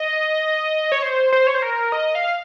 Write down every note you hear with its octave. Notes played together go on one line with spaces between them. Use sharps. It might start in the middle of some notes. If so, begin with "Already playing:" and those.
Already playing: D#5
C#5
C5
C5
C#5
C5
A#4
D#5
F5